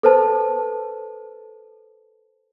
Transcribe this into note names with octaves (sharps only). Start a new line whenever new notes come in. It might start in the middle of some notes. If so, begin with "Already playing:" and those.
A4 B4 C5 A5